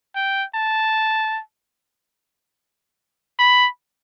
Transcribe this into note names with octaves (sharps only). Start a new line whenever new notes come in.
G5
A5
B5